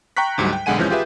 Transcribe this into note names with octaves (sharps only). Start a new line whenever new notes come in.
G5 A#5 C#6 F#6 B6
D2 G#2 F#3 G3
G5
B1 D3 G#3 F#5 G#5 D#7
G#1 E3 F3 G#3 C#4 G6
F4 G4 G#4 B4 E5